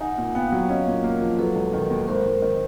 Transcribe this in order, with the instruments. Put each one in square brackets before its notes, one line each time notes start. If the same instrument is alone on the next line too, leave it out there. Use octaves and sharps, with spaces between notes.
[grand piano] D#4 [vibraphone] F#5 G#5
[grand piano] A#2
[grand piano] B3 [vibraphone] F5 G5
[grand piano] F#3
[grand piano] C#4 [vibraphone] D#5 F5
[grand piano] A#2
A#3
F3
[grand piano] F#3 [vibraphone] A4 B4
[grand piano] E1
D#3
D#2
[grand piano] G#1 [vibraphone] A#4 C5
[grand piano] G#1
D#3